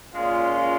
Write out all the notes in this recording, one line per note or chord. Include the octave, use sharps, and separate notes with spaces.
A#2 G#3 C#4 F4